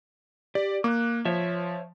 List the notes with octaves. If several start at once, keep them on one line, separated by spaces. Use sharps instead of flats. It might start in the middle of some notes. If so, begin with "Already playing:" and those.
G4 D5
A#3 D6 F#6
F3 C5 C#5 E5